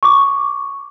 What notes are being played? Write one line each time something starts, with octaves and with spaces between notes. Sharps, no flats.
C#6 D6